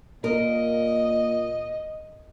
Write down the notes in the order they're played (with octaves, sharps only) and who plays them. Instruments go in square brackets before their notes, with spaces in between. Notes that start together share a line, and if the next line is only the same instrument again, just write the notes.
[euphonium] A#2 [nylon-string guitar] A#4 [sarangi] D#5